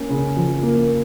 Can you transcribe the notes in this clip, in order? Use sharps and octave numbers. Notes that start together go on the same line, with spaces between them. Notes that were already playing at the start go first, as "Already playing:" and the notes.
Already playing: A#3 C#4
C#3
F3
A#3